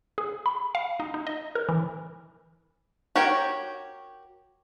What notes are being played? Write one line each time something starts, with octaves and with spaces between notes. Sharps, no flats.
G#4
B5
F5
D#4
D#4
D#5
A#4
E3
F#4 G4 A#4 C#5